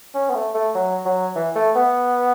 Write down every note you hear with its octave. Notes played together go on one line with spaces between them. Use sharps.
C#4
B3
A3
A3
F#3
F#3
E3
A3
B3